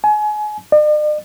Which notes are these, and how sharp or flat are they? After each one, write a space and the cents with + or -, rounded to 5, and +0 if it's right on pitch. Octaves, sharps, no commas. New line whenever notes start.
G#5 +30
D5 +45